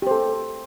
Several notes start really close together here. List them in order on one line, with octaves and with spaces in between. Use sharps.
G4 C5 A4